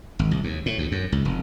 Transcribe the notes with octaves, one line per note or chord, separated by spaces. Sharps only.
G#1
C2
D#2
A2
D2
F#2
C#2
F1